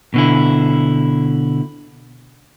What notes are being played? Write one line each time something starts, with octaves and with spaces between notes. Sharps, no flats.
B2 D3 E4